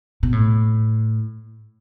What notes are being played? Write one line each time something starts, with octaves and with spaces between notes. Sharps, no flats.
B2
A2